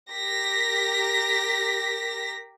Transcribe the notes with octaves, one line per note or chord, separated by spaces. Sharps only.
G4 A#4 A#6 B6